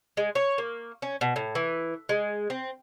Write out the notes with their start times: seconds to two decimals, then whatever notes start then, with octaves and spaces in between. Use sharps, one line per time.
0.17 G#3
0.35 C#5
0.58 A#3
1.02 C#4
1.21 B2
1.36 A2
1.55 E3
2.09 G#3
2.50 C4